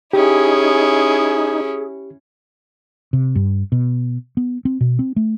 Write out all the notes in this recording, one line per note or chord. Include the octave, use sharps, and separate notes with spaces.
C#4 D#4 E4 G4 G#4
C3
G2
B2
B3
C4
B2
C4
A3